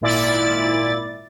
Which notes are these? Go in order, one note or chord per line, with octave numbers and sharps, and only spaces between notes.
G#1 A#2 E4 D5 A6